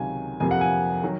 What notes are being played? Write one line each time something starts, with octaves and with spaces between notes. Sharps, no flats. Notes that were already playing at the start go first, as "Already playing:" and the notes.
Already playing: C#2 C3 D#3 F#3 G#5
F2 C3 F3 A#3 G#5
F#5
G#5
D#3 F#3